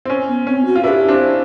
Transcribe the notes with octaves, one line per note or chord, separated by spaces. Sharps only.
C4
C#4
B3
C4 C#4
F#4
F4
D4 E4 G4 B4
C4 D4